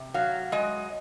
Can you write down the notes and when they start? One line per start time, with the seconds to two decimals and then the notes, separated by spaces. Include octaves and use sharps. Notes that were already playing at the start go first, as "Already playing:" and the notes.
Already playing: C3
0.14 F#3 F5
0.52 G#3 D#5